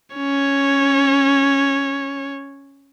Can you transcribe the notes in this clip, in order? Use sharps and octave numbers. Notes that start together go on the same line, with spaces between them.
C#4 C#5